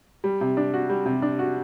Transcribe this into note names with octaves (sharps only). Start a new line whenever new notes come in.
G3
C3
D4
F#4
G3
C3
D4
F#4